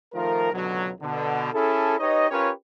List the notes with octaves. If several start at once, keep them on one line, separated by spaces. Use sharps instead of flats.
D#3 F3 A3 F4 A#4
C#2 B2 D3 F#3
B2 D3
C#4 E4 G#4 A4
D#4 G4 B4 C#5 D#5
C#4 F4 G4 A#4 B4 C#5